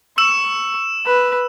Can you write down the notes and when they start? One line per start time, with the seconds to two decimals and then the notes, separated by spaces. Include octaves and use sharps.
0.18 C#6 E6 E7
1.06 B4